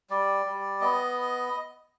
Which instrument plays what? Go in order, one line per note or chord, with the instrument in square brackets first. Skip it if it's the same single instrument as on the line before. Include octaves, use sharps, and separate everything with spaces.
[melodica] G3 D5
G3
B3 D#5